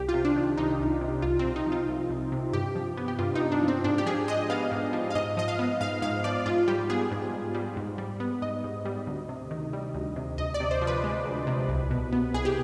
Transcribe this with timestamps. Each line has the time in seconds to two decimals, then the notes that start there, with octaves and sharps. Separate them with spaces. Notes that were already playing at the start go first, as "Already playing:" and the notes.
Already playing: C2 G4
0.09 F4
0.14 C3
0.25 D4
0.36 D#3
0.57 C2 D#4
0.79 C2
1.01 C3
1.22 C2 F4
1.39 C4
1.45 C3
1.56 D#4
1.66 F3
1.72 F4
1.88 C2
2.10 C2
2.32 C3
2.53 G2 G4
2.75 F3
2.97 B3
3.08 G4
3.19 G2 F4
3.35 D#4
3.41 G2
3.52 D4
3.62 F3
3.68 C4
3.84 G#2 D4
3.98 G4
4.06 F3 G#4
4.28 G#3 D#5
4.50 B3 F5
4.71 G#2
4.93 F3
5.10 F5
5.15 G#2 D#5
5.37 F3 D#5
5.48 F5
5.59 B3
5.81 G#2 F5
6.02 G#2 F5
6.24 F3 D5
6.46 G#2 F4
6.68 G3 G4
6.90 B3 G#4
7.11 G#2
7.33 G#2
7.55 G3
7.77 G#2
7.98 G3
8.20 B3
8.42 G#2 D#5
8.64 G#2
8.85 G3
9.07 D2
9.29 C3
9.51 D#3
9.73 G3
9.95 D2
10.16 C3
10.38 D2 D#5
10.54 D5
10.60 C3
10.71 C5
10.82 F3
10.87 B4
11.04 G#3
11.25 D2
11.47 C3
11.69 C2
11.91 B2
12.13 B3
12.34 C2 G#4
12.45 G4